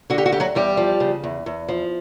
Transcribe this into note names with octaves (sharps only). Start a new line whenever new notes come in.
D3 F#4
G4
F#4
D2 G4
F#3 F#4
E2 G3 G4
F3
C#3
E2
E2
F3